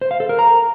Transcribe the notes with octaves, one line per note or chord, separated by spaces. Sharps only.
C5
F5
A4
A#4
A#5